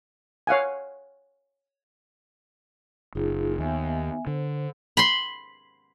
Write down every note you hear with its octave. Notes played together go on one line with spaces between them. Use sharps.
C#5 F5 F#5 G#5
F#1 D#4 F4 G#4
D#2 B3 E5 G#5
D3 C5
B5 C6